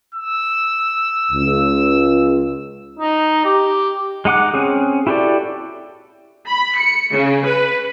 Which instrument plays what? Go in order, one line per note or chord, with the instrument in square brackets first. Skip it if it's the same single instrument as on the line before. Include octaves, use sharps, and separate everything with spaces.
[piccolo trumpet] E6
[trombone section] C#2
[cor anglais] D#4
G4
[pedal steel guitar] G#3 D#4 F#5 D6 F#6
C4 C#4 G#4
E4 F#4 G4 A4 D5
[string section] B5
C#7
C#3
B4